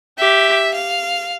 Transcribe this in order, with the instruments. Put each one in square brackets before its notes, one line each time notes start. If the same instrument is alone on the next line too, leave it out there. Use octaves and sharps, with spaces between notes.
[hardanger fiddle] G4 [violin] E5
[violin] F5